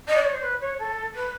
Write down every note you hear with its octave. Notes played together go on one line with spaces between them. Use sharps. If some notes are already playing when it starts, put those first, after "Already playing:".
D#5
D5
C#5
C5
B4
C#5
A4
B4